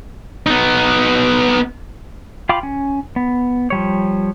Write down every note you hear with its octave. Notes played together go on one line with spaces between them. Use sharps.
B3 D#4
F4 F5 G5 B5 D6
C#4
B3
F3 G3 C#5